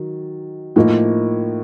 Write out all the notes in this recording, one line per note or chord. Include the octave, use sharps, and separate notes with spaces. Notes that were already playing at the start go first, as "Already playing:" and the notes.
Already playing: D#3 F#3
A2 F3 A#3 D#4